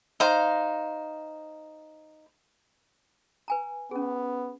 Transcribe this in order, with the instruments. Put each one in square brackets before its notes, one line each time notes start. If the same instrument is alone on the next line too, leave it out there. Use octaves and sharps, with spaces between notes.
[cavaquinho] D#4 C5 F5
[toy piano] B4 G#5 A#5
[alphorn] B3 [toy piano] C#4 G#4